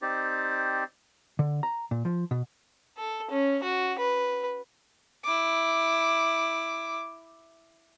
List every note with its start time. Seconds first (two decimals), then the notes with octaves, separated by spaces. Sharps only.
0.02 C4 D#4 G4 C5 D5
1.39 D3
1.63 A#5
1.91 A#2
2.05 F3
2.31 B2
2.98 A4
3.31 C#4
3.63 F#4
3.99 B4
5.24 E4 D6